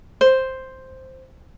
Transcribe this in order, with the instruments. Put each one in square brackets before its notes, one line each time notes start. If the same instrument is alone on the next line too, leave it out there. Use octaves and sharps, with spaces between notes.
[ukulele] C5